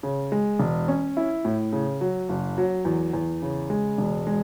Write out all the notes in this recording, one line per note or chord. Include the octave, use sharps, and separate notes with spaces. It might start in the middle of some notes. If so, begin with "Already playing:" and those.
C#3
G#3
E1
C#4
E4
A2
C#3
F#3
F#1
F#3
E2
E2
C#3
G#3
E1
G#3